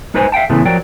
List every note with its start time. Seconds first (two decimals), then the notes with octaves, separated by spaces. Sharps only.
0.14 G#3 D#4 B4 C5 D#5 G#5
0.32 E5 F5 G5 A5
0.50 A2 C#3 E3 G#3 A3 B3
0.65 F3 F#3 A#4 D5 G5